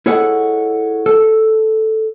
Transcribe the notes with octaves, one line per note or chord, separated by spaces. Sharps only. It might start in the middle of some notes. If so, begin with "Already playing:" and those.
E4 G#4 A4 C#5 D#5 F#5
A4